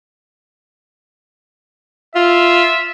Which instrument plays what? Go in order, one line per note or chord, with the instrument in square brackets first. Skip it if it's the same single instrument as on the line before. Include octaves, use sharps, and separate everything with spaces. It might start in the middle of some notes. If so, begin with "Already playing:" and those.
[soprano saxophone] F4 [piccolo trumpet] E5